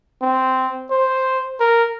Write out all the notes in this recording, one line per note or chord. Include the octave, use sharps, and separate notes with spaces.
C4
C5
A#4